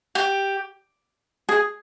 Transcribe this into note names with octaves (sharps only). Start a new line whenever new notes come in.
G4
G#4